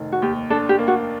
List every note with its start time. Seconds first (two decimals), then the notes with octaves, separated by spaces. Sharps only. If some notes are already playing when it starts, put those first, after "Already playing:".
Already playing: F1 D#3
0.12 F#4
0.22 D#2 G4
0.50 D4 A4
0.69 G4
0.79 A#3
0.88 F#4